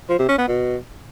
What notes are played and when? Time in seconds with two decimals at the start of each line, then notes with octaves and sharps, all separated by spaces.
0.09 F3
0.19 C3
0.29 C#4
0.38 B3
0.48 B2